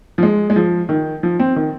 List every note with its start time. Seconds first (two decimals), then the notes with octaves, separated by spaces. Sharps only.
0.18 F3
0.23 G#3
0.50 G#3
0.56 F3
0.89 D#3
1.23 F3
1.40 C4
1.56 D#3